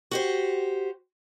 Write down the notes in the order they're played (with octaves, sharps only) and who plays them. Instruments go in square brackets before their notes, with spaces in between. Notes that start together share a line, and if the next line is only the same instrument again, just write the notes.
[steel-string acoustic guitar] F#4 G4 C5